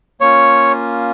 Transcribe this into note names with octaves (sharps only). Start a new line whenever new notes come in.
A#3 C#4 F4 C#5